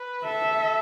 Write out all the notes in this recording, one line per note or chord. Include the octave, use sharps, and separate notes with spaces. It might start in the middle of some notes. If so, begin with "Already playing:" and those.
Already playing: B4
A4 E5